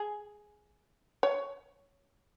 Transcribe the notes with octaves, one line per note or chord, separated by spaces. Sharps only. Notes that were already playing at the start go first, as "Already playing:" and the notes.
Already playing: G#4
C#5